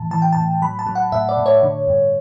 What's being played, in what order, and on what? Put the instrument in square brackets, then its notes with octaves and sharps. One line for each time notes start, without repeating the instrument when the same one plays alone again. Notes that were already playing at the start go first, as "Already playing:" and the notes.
Already playing: [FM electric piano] A2 E3 A5
E3 A5
G5
A2 A5
F#3 B5
A5
F#3
F#5
A2 E5
D5
A2
C#5
D3
G2